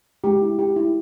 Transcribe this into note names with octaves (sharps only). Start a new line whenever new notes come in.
G#3 G4
E4
G4
E4